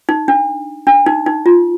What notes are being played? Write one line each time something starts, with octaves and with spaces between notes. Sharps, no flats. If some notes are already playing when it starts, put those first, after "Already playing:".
D#4
D4
D4
D#4
D#4
F4